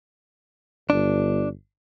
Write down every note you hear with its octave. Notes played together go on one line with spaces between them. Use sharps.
G1 D4